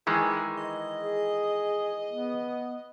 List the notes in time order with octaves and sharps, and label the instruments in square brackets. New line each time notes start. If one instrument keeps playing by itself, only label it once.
[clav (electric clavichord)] D#3 E3 G#3 [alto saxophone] G#4
[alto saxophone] D#5
[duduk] G#4
B3